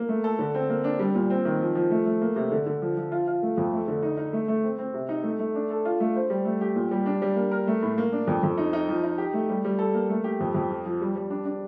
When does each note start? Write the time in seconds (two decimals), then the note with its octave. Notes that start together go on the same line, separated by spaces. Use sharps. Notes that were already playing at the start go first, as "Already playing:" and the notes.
Already playing: A#3
0.09 A3
0.24 A4
0.39 D3
0.55 C4
0.70 A#3
0.84 D4
0.99 G3
1.15 A#2
1.30 C4
1.45 D#3
1.60 F3
1.75 F3
1.91 A3
2.05 A3
2.22 A#3
2.36 C3
2.52 D3
2.66 D3
2.82 F3
2.97 F3
3.12 F4
3.27 F4
3.43 A3
3.57 F2
3.73 A3
3.88 D3
4.03 D#4
4.17 D#4
4.33 A3
4.48 A3
4.64 C4
4.78 C4
4.94 C3
5.09 D#4
5.24 A3
5.39 A3
5.55 D4
5.70 A4
5.85 F4
6.00 A3
6.16 C5
6.30 G3
6.45 A3
6.61 G4
6.76 A#2
6.91 G3
7.06 D4
7.22 G3
7.36 A#3
7.51 A#4
7.67 A3
7.83 A2
7.98 A#3
8.12 D4
8.27 F2
8.43 F2
8.58 D#4
8.73 D#4
8.89 F3
9.04 D#4
9.18 G4
9.34 A3
9.49 G3
9.65 G3
9.79 A4
9.94 A#3
10.10 A3
10.24 G4
10.40 F2
10.54 F2
10.70 F3
10.86 F3
11.01 G3
11.16 G3
11.30 D4
11.45 D4